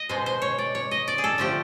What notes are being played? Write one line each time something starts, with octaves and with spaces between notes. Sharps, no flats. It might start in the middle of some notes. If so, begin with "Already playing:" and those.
Already playing: D#5
B2 G#3 C5
C5
C#5
D5
C#5
D#5
D5
G#4
A4
D3 F3 A3 G4